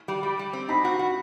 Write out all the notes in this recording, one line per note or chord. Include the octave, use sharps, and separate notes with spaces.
G3
G3
G3
C4
D#4 B5
F#4
F#4